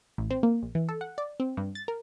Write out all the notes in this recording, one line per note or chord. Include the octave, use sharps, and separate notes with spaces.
A1
C4
A#3
A#1
E3
A4
F#5
D5
C4
G2
A6
A#4